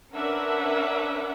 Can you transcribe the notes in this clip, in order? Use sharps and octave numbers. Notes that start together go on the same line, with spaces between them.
C#4 D4 A#4 B4 E5 F#5